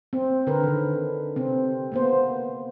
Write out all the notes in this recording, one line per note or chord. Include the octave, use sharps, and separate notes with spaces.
C4
D3 A#4 B4
D3 D#3
C3 C4
A#3 B3 C5